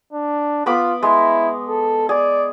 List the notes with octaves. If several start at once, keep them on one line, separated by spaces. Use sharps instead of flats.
D4
B3 F4 B5 D6
G#3 E4
A4
G#4 D5